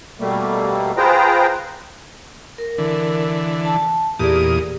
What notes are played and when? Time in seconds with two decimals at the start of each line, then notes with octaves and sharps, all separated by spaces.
0.20 B2 G3 A3 A#3
0.97 F4 G#4 B4 C5 G5 A#5
2.58 A#4
2.78 D3 E3
3.65 A5
4.19 E2 A#2 G4 G#4 D5 D#6